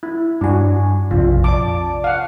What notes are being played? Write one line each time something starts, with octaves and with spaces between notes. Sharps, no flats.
E4
G2 D4 F#4 G#5
A#1 F2 C3 F4
D5 A5 D6
F5 F#5